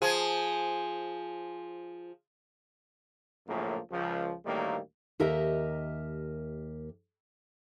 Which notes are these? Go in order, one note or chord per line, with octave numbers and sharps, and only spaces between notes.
F3 G#4
A#1 F#2 A2 C#3 F3 A#3
C#2 F3
D2 A2 D#3 G3 A#3
D#2 G4 A#4 D#5 E5 A#5